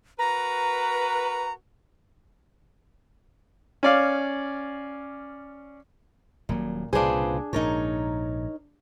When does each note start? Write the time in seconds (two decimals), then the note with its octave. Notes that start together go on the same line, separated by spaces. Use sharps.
0.19 F#4 A#4 B4 A#5
3.83 C#4 D5 F5
6.49 D#1 A#2 F#3
6.93 C2 A#2 C#3 D4 F4 G#4 B4 C5
7.53 A#1 G#2 D#4 A#4 C#5